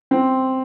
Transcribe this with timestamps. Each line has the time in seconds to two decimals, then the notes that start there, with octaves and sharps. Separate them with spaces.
0.11 C4